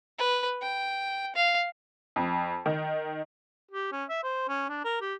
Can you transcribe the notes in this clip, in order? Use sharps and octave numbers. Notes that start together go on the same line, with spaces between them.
B4
G5
F5
F2
D#3
G4
C#4
E5
C5
C#4
D4
A#4
G4